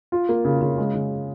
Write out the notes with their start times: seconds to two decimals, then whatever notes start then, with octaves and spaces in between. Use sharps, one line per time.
0.12 F4
0.29 A#3
0.45 C#3
0.62 C#3
0.78 G#3
0.95 C#3